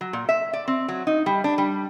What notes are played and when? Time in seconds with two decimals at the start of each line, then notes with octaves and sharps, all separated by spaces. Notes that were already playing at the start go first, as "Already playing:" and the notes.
0.01 F#3
0.13 A#2
0.29 E5
0.53 D5
0.68 C4
0.88 F#3
1.07 D#4
1.26 G3
1.44 D4
1.58 G3